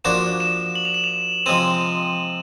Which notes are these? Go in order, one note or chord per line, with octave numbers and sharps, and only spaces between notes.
F3 A#3 D4 F#4 E7
E7
F#7
F7
E7
F7
C3 F3 G#3 C4 D#7